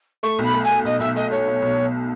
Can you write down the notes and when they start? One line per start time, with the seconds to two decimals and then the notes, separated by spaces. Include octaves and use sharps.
0.23 A3 C#6
0.39 B1
0.44 B5
0.54 A3
0.64 G#5
0.70 A3
0.85 B1 D#5
1.00 B1 E5
1.16 A3 D#5
1.31 A3 C#5
1.47 B2
1.62 B1
1.77 B2